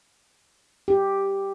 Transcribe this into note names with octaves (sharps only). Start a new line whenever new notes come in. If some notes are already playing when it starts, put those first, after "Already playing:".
G4